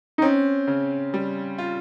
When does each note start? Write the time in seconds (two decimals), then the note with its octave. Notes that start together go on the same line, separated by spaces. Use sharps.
0.18 D#4
0.22 C4 C#4
0.67 C#3
1.14 G3
1.58 F4